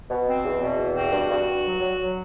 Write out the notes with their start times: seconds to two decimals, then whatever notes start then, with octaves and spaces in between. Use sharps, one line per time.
0.10 B2
0.27 C4
0.44 E2
0.61 B2
0.78 E2
0.95 C4 F#4
1.12 G2
1.30 G2
1.47 G2
1.64 F#3
1.81 F#3
1.98 F#3